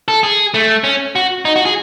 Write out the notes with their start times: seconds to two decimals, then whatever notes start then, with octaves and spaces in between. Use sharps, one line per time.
0.08 A4
0.23 G#4
0.54 A3
0.84 C#4
1.16 F#4
1.45 D#4
1.56 F#4
1.65 G#4